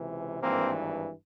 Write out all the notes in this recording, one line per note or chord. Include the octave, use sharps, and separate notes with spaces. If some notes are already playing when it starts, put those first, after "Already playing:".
Already playing: C#2 C3 E3
G#1 G2 E3 A#3 C4